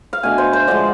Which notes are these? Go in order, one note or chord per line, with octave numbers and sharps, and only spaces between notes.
F5
B2 A3 D4 G#5
C5
C5
D3 F3 G#3 D5